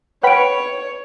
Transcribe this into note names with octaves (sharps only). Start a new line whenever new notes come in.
B4 C#5 F#5 G5 B5 D7